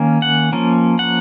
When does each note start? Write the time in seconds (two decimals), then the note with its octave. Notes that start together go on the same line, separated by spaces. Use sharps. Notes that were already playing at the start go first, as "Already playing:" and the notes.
Already playing: D#3 A#3 C#4
0.22 F#5
0.53 F3 A#3 C#4
0.99 F#5